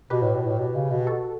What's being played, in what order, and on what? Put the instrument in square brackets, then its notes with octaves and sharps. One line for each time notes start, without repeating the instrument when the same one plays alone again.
[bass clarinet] B2 [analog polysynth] G4 B4
[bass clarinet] A2
B2
A2
B2
C#3
B2
[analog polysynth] F#4 A4